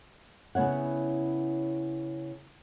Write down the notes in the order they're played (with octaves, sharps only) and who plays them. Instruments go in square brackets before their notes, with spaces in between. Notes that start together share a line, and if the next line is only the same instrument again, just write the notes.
[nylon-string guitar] C#3 B3 E4 C#5 F#5